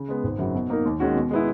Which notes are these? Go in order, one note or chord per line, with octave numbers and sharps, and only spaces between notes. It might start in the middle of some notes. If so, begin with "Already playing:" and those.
Already playing: C#3
G#3 B3
G#1
F#2 C#3 F#3
B2
A#3 D#4 A#4
D#2
D#3 G#3 C#4 F#4
B2
G#3 B3 E4